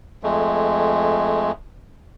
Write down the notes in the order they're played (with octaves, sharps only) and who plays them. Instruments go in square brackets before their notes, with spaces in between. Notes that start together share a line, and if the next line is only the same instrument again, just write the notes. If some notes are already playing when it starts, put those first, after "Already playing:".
[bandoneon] F2 G#3 A3